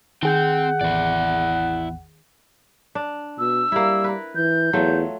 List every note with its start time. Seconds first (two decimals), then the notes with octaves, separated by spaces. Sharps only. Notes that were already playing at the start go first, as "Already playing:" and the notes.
0.23 D#3 C4 G#4 F#5 G5 G6
0.81 A1 E2 E4 D5
2.95 D4
3.39 B2 E6
3.72 G3 A#3 E4
4.04 A#4 B4
4.35 E3 G6
4.73 E2 F#3 A3 F4